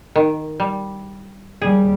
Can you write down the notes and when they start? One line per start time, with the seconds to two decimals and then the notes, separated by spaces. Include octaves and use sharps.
0.16 D#3
0.60 G3
1.62 D#2 G3 G#4